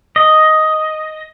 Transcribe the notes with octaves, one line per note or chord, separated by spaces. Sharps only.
D#5